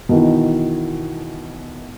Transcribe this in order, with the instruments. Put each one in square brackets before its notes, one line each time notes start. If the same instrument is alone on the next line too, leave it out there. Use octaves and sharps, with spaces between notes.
[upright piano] B2 D#3 E3